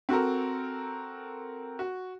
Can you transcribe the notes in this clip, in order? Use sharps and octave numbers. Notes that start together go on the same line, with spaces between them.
C4 F#4 A4 A#4
F#4